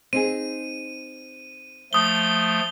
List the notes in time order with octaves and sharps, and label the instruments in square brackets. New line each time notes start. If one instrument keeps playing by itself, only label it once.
[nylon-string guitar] C4 D#4 G#4 [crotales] D#7
[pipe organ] F3 A3 [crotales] D#6 G7